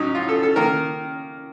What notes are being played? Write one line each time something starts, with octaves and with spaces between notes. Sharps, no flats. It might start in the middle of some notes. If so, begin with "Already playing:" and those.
Already playing: A2 F#3 C#4 D#4
F4
A4
A4
D#3 A#3 A#4